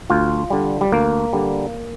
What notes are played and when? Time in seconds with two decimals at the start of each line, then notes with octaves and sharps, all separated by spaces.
0.10 D2 F4
0.50 D3 G3
0.81 G3
0.92 D2 A#3
1.33 D3 G3